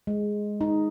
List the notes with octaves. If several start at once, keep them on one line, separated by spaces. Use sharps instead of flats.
G#3
D#4